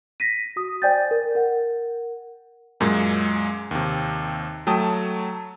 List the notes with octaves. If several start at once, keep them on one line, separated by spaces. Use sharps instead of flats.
A#6 B6 D#7
F#4 D#6
C5 D5 G5 G#5 G6 A6
A#4
A#4 F#5
F#2 A#2 G#3
D#2 C3
F#3 A3 G5 A5 D#6